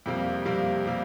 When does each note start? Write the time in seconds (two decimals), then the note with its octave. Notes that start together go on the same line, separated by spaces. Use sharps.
0.06 F2 C3 G3 A#3
0.45 F2 C3 G3 A#3
0.87 C3 G3 A#3